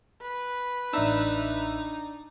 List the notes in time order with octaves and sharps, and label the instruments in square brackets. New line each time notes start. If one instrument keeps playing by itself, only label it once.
[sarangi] B4
[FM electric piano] A1 E5 E6 [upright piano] D4 [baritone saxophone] D#4